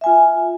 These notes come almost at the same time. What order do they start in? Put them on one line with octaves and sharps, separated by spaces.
E5 G#5 F4